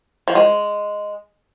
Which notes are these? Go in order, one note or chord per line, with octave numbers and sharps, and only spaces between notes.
F3
G#3